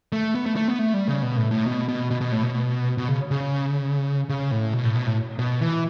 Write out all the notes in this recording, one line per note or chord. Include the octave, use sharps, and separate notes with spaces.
A3
B3
A3
A3
B3
A3
G3
C#3
B2
A2
A2
B2
B2
B2
B2
A2
B2
B2
C#3
C#3
C#3
A2
B2
A2
B2
A2
B2
E3